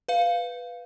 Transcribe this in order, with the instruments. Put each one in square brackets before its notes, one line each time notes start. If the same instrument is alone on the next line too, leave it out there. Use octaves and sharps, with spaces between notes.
[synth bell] B4 F5